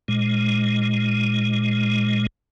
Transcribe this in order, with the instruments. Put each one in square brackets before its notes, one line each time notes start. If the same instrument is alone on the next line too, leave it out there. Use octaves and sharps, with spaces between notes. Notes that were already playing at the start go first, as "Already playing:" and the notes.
[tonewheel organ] A#2 G#3